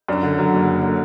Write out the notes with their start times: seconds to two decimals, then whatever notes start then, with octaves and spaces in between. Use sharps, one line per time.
0.08 F#2 D4
0.23 D3
0.39 F#3
0.53 F#1
0.69 F#2
0.84 D3